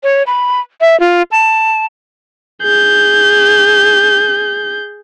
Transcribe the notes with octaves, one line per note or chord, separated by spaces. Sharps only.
C#5
B5
E5
F4
A5
G#4 G6